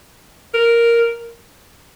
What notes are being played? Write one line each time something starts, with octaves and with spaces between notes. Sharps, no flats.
A#4